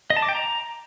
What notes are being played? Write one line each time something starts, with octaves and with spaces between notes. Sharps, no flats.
D#5
A5
D6
G5
A#5